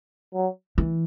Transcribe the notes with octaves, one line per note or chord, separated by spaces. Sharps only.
F#3
E3